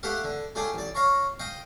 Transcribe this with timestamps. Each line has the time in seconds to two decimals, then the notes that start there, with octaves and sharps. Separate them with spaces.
0.03 A3 B3 G4 F5 F#5
0.24 D3
0.55 A3 F4 G#4 D5 G5
0.74 A1 D5
0.95 C#5 F5 A#5 C#6
1.39 D#5 F5 G5